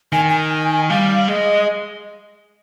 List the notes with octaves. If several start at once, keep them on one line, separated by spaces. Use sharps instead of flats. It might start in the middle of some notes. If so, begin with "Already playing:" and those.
D#3 G#5
G#5
G3 F5
G#3 D#5